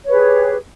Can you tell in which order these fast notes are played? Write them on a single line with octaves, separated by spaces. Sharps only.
C#5 B4 G#4 G4